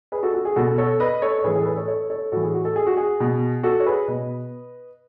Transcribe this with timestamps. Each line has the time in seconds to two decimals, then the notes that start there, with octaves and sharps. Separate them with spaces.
0.12 G#4 B4
0.23 F#4 A4
0.34 F#4
0.45 G#4
0.56 B2 F#4 A4
0.78 A4 C#5
1.00 B4 D#5
1.22 A4 C#5
1.39 C#5
1.44 A2 G#4 B4
1.47 E3
1.55 G#4
1.62 A4
1.66 G#4 B4
1.77 A4 C#5
1.88 A4 C#5
2.10 A4 C#5
2.32 A2 E3 F#4 A4
2.43 G#4
2.54 F#4
2.65 A4
2.76 G#4
2.87 F#4
2.97 G#4
3.20 B2
3.63 F#4 A4
3.80 C#5
3.86 G#4 B4
4.08 B2 B4 D#5